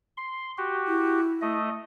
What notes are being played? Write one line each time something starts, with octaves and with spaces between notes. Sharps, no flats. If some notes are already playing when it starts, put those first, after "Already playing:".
C6
F#4 G4
E4
A3 D#5